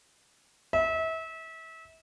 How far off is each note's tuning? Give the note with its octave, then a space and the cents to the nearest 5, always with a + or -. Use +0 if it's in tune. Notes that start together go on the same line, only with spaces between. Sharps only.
E5 -30